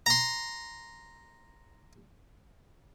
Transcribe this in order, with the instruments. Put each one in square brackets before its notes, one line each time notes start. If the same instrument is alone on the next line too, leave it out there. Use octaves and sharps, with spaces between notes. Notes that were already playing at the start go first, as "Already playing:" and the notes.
[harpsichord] A#5 C6